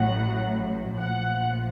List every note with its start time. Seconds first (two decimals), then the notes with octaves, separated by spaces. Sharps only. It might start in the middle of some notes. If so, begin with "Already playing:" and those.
Already playing: A1 A2 F#3 F#5
0.97 A#1 A2 F3 F#5